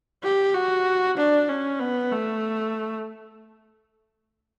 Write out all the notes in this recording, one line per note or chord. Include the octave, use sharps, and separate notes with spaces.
G4
F#4
D4
C#4
B3
A3